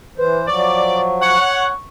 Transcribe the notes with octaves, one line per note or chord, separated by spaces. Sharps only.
E3 B4 C5
F3 F#3 D5 C#6
C#5 F#5